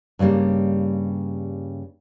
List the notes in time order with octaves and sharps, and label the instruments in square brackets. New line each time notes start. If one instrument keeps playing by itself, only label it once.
[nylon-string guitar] G2 C#3 F3 G3 A#3